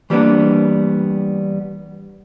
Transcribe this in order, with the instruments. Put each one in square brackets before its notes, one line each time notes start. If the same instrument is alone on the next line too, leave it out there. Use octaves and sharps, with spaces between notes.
[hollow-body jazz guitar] E3 G3 A#3 B3 D4